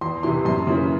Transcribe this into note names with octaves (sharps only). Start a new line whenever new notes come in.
E2 C6
C3 E3 C6
F#2 C6
C#3 E3